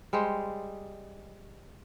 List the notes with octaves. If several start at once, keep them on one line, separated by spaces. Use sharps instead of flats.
G3 G#3 C5